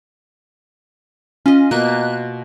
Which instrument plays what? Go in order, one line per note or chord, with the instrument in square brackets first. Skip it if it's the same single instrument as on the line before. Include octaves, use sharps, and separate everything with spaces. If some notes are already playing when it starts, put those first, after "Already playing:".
[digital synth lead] C#4 [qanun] F4 D#5
[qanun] B2 A#3 F4 [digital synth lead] F#6